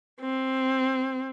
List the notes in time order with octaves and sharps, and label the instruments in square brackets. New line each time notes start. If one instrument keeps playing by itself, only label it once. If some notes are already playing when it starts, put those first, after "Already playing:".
[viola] C4